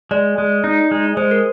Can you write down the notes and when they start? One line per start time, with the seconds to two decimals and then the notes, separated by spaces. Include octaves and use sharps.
0.11 G#3 D5
0.38 G#3
0.64 D#4
0.91 G#3
1.17 G#3 C5
1.31 A#4